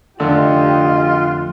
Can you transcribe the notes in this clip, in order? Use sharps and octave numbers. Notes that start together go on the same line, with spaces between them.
F2 D3 A3 F4 G4 D#5